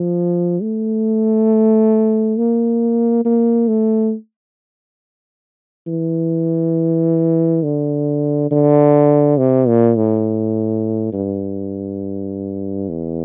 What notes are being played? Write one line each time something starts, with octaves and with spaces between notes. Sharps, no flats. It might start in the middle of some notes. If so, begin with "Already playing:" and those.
Already playing: F3
A3
A#3
A#3
A3
E3
D3
D3
C3
A#2
A2
G2
E2